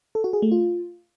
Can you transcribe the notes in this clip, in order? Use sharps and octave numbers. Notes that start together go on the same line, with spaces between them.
A4
F#4
G#4
A3
F4